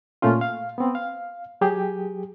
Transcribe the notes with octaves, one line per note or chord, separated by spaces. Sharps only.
A#2 A3 C#4 F4
F5
B3 C4
F5
F#3 G4 G#4